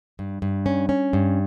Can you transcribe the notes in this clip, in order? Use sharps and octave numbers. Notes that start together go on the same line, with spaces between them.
G2
G2
C#4
C#4
G2